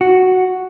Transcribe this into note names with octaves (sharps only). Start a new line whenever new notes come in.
F#4